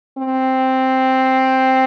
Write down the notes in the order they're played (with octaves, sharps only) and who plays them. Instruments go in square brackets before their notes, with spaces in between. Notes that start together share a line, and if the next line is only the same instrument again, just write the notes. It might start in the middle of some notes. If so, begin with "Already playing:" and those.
[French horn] C4